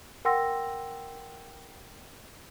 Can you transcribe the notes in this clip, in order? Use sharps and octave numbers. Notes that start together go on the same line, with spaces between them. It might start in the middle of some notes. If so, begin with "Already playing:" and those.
A#4 F#5 G5 C6 E6 A#6